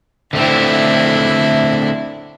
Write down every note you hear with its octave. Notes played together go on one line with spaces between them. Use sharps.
D3 A3 C4 D4 E4